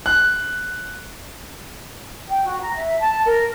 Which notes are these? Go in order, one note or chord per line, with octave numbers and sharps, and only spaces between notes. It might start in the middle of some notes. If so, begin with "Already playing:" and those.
F#6
G5
F#4
A#5
E5
A5
A#4